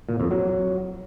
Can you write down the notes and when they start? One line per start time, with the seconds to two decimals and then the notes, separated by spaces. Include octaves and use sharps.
0.09 A#2
0.20 F2
0.31 F#3